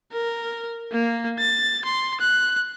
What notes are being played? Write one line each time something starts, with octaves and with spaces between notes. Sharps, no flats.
A#4
A#3
A6
C6
F#6